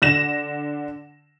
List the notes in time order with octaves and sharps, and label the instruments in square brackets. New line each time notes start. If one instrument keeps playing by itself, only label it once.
[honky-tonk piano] D3 A#6 E7